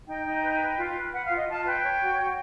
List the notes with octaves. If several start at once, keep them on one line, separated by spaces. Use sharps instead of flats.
D#4 G5
D#4
B4
B4
F4
B4
B4 F#5
F5
F4 D#5
F4 A5
B4 G5
C#5
F#4
F#4